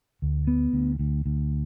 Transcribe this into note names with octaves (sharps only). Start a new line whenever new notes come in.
D2
B3
D2
D2
D2